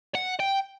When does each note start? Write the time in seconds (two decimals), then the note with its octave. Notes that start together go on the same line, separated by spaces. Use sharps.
0.15 F#5
0.40 G5